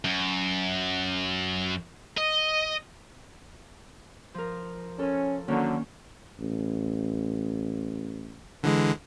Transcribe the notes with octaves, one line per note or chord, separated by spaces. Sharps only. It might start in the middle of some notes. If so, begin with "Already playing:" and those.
F#2
D#5
F3 A#4
C#4 A4 A#4
D3 D#3 F#3 A#3 C#4
A1
D3 E3 G#3